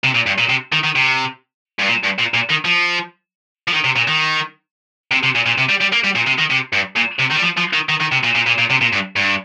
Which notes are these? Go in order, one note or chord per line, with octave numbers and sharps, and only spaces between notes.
C3
A#2
G2
A#2
C3
D#3
D#3
C3
G2
A#2
G2
A#2
A#2
D#3
F3
F3
D#3
C3
A#2
D#3
C3
C3
A#2
A#2
C3
G3
G3
A#3
G3
A#2
C3
D#3
C3
G2
A#2
C3
D#3
G3
F3
F3
D#3
D#3
D#3
C3
A#2
A#2
A#2
A#2
C3
A#2
G2
G2